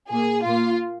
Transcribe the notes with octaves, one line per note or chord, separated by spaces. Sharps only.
A#2 A#3 G#4
A#2 A#3 F4